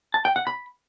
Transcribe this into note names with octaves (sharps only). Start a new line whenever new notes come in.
A5
G5
F#5
B5